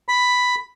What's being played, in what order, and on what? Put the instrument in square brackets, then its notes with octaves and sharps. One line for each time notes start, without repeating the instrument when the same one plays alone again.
[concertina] B5